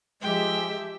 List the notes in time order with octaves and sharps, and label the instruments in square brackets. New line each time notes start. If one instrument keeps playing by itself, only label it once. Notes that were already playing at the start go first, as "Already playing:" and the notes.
[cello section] F3 G4 E5 [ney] G#3 [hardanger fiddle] G5